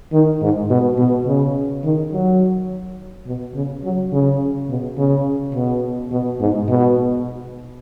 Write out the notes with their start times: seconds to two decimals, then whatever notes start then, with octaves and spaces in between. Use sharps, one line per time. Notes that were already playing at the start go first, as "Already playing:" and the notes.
0.13 D#3
0.42 G#2
0.70 B2
0.98 B2
1.27 C#3
1.84 D#3
2.12 F#3
3.27 B2
3.55 C#3
3.84 F#3
4.12 C#3
4.69 B2
4.98 C#3
5.54 B2
6.11 B2
6.40 G#2
6.69 B2